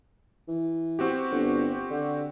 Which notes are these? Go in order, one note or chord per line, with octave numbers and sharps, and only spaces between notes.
E3
C4 F#4 G4
G1
D3